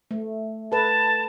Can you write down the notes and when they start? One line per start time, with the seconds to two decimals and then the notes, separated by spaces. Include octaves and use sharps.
0.11 A3
0.72 A4 B4 A5